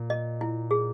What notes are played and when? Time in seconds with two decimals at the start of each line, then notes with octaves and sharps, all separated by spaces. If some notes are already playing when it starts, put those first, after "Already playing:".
Already playing: A#2
0.10 D#5
0.41 E4
0.71 G#4